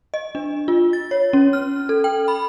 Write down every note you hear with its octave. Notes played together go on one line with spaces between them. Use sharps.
D#5
D4
F4
A6
C#5
C#4
F6
A4
G5
B5